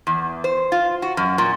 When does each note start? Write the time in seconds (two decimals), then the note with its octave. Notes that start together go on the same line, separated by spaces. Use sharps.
0.07 E2
0.44 C5
0.72 F4
1.02 F#4
1.17 F#2
1.38 A#2